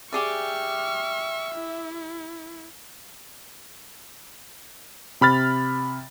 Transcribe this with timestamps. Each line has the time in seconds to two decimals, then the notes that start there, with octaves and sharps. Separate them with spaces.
0.13 G4 G#4 D5 E5 C#6 F6
1.55 E4
5.21 C3 B5 F6 A6